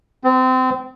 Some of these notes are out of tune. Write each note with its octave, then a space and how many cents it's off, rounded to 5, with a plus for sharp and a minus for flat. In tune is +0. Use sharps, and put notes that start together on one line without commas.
C4 -25